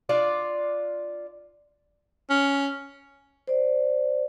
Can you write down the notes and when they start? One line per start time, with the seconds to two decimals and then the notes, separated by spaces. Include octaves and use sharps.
0.09 D4 F4 D5
2.30 C#4
3.47 C5 D5